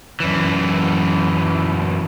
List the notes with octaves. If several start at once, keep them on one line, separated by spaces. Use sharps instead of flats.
F#2 E3